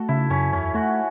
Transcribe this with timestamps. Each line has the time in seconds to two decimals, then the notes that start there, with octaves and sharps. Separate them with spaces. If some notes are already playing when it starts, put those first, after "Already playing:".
Already playing: A3 F#4 A4
0.09 C#3 E4
0.30 F#2 C#4
0.53 E2 C#4
0.75 A3 F#4